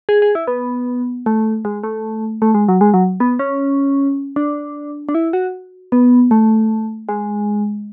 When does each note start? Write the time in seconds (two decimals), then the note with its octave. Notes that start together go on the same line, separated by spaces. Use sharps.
0.09 G#4
0.22 G#4
0.35 E4
0.47 B3
1.26 A3
1.65 G#3
1.83 A3
2.42 A3
2.55 G#3
2.68 F#3
2.81 G#3
2.94 F#3
3.20 B3
3.39 C#4
4.36 D4
5.09 D4
5.15 E4
5.33 F#4
5.92 B3
6.31 A3
7.09 G#3